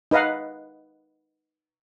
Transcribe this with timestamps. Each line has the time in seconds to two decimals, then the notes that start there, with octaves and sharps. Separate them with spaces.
0.11 D#4 B4 D#5 F5 F#5